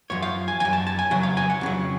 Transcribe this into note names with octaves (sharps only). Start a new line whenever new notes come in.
F#2 F3 C#5
F5
G#5
F#2 F3 G#5
A5
A5
G#5
F2 C#3 F#3 F#5
F5
G#5
F#5
F2 C#3 F#3